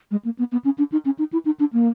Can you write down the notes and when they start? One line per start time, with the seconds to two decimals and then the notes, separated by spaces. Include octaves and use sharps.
0.11 G#3
0.25 A#3
0.38 B3
0.52 B3
0.65 C#4
0.78 D4
0.92 D#4
1.05 C#4
1.19 D#4
1.33 E4
1.45 D#4
1.60 D4
1.73 A#3